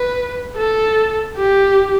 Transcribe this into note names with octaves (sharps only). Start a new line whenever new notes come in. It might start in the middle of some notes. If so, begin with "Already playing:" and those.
Already playing: B4
A4
G4